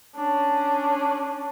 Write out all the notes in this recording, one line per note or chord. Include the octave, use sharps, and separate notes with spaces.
C#4 D4